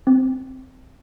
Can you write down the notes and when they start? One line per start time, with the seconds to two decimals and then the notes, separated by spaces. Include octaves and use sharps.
0.07 C4